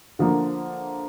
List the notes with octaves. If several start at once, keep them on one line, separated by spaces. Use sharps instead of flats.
D3 F3 A#3